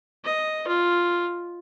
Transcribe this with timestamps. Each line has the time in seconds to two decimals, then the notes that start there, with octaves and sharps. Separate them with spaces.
0.24 D#5
0.67 F4